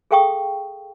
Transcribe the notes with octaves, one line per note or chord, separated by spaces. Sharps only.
G#4 A4 F5 G5 C#6 D#6